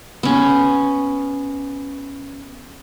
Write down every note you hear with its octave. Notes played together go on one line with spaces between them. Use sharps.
B3 C#4